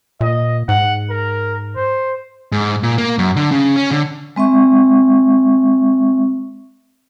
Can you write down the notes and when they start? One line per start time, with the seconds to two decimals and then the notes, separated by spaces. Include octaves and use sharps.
0.21 A#2 D#5
0.69 G#2 F#5
1.10 A#4
1.76 C5
2.52 G#2
2.83 A#2
2.98 A#3
3.19 F#2
3.36 D3
3.51 C#3
3.76 C#4
3.91 D3
4.36 G#3 C4 E5 C#6